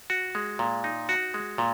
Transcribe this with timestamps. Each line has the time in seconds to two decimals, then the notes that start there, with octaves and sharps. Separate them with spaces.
0.10 F#4
0.35 G#3
0.59 A#2
0.84 D#4
1.09 F#4
1.34 G#3
1.58 A#2